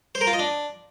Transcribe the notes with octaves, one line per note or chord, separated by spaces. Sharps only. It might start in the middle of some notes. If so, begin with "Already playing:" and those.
C5
A#4
F4
D#5
D4